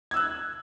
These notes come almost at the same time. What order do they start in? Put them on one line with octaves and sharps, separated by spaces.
G#6 E6 F#6